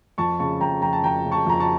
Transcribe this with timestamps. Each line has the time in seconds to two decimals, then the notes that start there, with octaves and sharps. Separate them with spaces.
0.18 F2 A5 C#6
0.39 C#3 A5 C#6
0.61 F2 G5 A#5
0.82 F2 G5 A#5
0.93 A5
1.03 F2 G5 A#5
1.25 C#3
1.32 A5 C#6
1.46 F2 A#5
1.60 A5 C#6